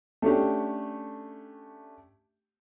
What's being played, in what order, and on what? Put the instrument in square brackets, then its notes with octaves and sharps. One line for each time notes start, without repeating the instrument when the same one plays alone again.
[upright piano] A3 C#4 D4 G4